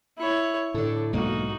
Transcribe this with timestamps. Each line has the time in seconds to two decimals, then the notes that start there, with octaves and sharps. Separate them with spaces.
0.18 E4 C#5
0.74 A2 D3 D4 A4
1.13 B1 G#2 A#3 D#4 F#4